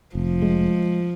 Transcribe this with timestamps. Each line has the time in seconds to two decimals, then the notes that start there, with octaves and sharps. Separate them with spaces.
0.15 F1 F3
0.42 G#3